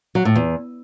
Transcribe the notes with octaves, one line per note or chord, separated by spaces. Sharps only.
F#3
A2
E2